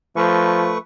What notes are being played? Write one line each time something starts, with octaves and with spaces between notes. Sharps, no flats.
F3 A3 B4 C#6